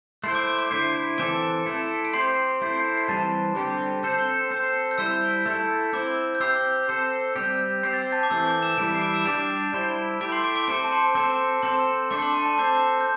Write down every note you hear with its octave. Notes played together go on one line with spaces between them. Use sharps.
A3 E4 C5 C6 C7
D6 D7
D6 D7
D6 D7
D3 A3 E4 C5
E3 C4 A4 D6 D7
A3 E4 A4
D7
C4 G4 C5 C6 C7
A3 E4 C5
C7
E3 G3 C4 A5 A6
D3 G3 C4 G4
C4 A4 C5 G6
C4 A4 C5
G6
G3 E4 C5 E6
A3 E4 A4
C4 E4 C5 D6
G6
C4 G4 C5 E6
C4 A4 C5
G3 C4 G4 G6
C4 G4 C5 C7
A6
G6
A5 A6
D6
E3 A3 C4 E6
D6
E6 E7
E3 G3 E4 D6 D7
C7
D6 D7
E6 E7
G3 D4 G4 D6 D7
G3 E4 C5
A3 E4 G4 D6 D7
C6 C7
D6 D7
D6 D7
C4 A4 C5 D6 D7
A5
C6
C4 A4 C5 D6
C4 A4 C5 C6
A3 D4 A4 D6
C6
A5
A5
C4 A4 C5 D6
G6